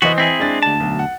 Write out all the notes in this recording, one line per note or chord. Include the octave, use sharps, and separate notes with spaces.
E3 B3 F#4 C5 D#5
C4 E4 G#4
G#3 D4 A6
D2 A5
B1
F#5